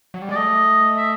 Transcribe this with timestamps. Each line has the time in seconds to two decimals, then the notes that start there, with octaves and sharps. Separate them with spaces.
0.14 F#3
0.22 G3
0.29 G#3 D5
0.36 A3 D#5
0.98 E5